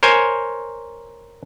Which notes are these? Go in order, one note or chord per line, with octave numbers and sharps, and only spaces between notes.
A#4 C5 C#5 G#5